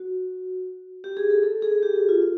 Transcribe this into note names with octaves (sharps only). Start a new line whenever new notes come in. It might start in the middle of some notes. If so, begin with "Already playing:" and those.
Already playing: F#4
G4
G#4
A4
A4
G#4
G4
F#4
F4
F4